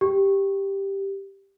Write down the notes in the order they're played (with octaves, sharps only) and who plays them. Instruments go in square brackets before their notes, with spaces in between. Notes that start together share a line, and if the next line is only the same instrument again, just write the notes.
[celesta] G4